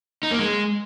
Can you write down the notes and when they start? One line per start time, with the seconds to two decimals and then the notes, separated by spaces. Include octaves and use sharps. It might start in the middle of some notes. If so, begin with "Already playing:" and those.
0.23 D#4
0.31 A#3
0.39 G#3